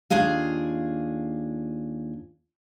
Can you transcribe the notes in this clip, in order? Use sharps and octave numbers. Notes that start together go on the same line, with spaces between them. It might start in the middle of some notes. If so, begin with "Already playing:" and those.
D#2 D4 F4 G#4 F5